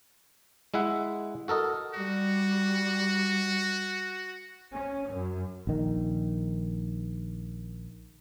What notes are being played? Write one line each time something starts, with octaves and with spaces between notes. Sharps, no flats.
G#3 E4 E5 F#5
F#4 A4 A#4 D#5
G3 F#4
C#4
F#2
A#1 D#3